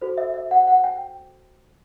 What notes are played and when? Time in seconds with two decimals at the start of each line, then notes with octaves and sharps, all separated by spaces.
0.02 F#4 A4 C5
0.17 E5
0.34 E5
0.51 F#5
0.67 F#5
0.84 G5